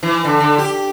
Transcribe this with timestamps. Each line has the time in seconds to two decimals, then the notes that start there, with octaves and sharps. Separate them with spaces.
0.03 E3
0.25 D3
0.40 D3
0.58 G4